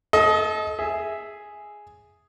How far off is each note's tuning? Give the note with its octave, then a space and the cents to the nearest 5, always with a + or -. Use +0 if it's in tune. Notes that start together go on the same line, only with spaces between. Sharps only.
A4 -35 D#5 +20
G#4 +0 E5 +0